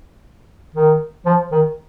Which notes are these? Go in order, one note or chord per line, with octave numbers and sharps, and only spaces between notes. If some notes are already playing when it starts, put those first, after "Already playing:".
D#3
F3
D#3